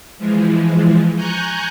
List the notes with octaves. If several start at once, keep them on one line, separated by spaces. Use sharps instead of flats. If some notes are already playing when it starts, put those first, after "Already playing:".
E3 F3 G#3
G#5 A#5 C#6 F#6 G6